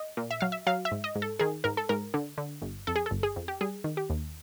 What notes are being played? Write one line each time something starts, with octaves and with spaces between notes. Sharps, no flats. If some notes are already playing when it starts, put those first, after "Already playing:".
Already playing: D#5
A#2
E5
F#3 F5
E5
F#3 F5
E5
G#2
D#5
G#2
A4
D#3 G#4
G#2 A#4
A4
G#2 A#4
D3
D3
G1
F2 A4
G#4
A4
G1
G#4
F2
G4
G3 G#4
D#3
G4
D#2